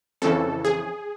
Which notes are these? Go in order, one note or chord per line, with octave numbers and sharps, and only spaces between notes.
F2 C#3 E3 A4
G#4